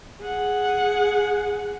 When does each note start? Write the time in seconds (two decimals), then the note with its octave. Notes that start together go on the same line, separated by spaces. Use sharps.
0.21 G#4 F#5